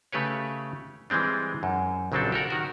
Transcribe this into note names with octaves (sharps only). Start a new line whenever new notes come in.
C#3 A3 G4 B4 C#5
E3 G3 G#3 C4 D4
F#2
A#1 C#3 F#3 C4 D4 A4
G4 A4 A#4 F#5
D#3 F#4